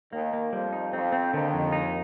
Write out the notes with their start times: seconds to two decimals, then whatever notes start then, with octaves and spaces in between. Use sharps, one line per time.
0.12 D#2 D#3 A#3
0.33 A#3
0.52 F2 F3 G3
0.73 D#4
0.93 F2 F3 C4
1.12 C4
1.32 D#2 D3 D#3
1.53 F2
1.72 D#4